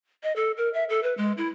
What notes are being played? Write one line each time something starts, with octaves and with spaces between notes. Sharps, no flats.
D#5
A4
A#4
E5
A4
B4
G#3
E4